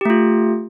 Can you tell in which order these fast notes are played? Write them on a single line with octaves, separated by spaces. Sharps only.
G4 A3 F4